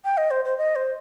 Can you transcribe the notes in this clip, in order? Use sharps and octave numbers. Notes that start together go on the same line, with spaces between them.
G5
D#5
C5
C5
D#5
C5